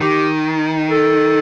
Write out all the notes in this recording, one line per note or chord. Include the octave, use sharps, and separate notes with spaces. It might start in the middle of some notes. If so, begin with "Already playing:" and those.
D#3 G4
A4